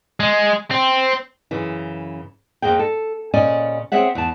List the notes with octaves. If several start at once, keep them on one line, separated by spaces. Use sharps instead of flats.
G#3
C4
F#2 C#3 E3
F2 C#3 A#3 G#4 G5
A4
A#2 C#3 C#4 D5 D#5 G#5
C4 G#4 C#5 E5 F#5
E2 A5